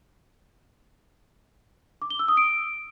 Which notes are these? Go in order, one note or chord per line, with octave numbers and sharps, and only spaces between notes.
D6
G7
E6
D#6
D7